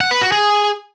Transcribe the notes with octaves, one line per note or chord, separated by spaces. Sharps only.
F#5
B4
F#4
G#4